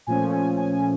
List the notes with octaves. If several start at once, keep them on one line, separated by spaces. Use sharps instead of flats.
A#2 F3 A3 C#4 G#5
G#5
G#5
G#5